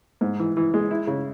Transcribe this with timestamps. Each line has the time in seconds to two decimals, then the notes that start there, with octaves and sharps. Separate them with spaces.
0.21 G#2
0.39 E3
0.57 E3
0.74 G#3
0.91 E4
1.07 C#3